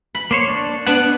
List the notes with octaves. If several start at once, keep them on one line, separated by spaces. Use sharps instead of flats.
B5
A#3 C5 C#5
D4
B3 D4 F#5